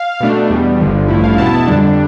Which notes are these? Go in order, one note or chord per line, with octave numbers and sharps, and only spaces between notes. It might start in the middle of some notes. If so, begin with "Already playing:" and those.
Already playing: F5
B2 A3 D4
E2 B2 G3
G1 G2 D3 F3
A1 G2 F3 A3 E4
F5
E2 B2 B3 E4 A5
F2 D3 G3 D4